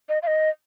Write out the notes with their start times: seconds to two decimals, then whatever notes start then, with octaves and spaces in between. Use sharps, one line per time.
0.09 D#5
0.23 F5
0.27 D#5